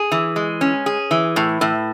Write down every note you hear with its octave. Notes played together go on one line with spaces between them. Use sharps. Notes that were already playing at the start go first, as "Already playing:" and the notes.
Already playing: G#4
E3
G#3
C#4
G#4
E3
A2
A2